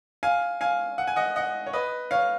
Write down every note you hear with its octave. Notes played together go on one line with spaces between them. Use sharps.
F5 G#5
F5 G#5
F#5
G#5
D#5 F#5
D#5 F#5
C#5
B4 D#5
C#5 F5